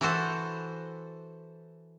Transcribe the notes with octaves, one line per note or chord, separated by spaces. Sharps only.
E3 E4 F#4 A4 C5